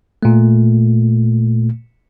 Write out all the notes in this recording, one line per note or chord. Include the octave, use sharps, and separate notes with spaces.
A#2 A3